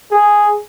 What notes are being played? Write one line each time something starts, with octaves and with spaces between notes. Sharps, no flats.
G#4